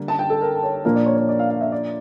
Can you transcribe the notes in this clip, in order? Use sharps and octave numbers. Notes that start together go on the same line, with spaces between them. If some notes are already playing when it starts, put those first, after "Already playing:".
Already playing: D3 G3 A#3
A5
G5
A4
A#4
C#5
A#2 F3 A#3 D4 A#4
D5
C#5
C#5
D5
F5
F5
E5
D5